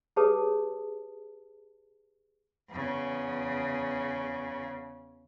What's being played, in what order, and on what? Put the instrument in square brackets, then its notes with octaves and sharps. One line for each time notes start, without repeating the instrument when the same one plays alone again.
[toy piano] G4 G#4 B4 C#5 A5 D#6
[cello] E2 C#3